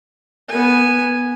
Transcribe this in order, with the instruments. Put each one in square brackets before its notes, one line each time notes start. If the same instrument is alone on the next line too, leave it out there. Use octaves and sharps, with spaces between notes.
[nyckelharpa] B3 G#5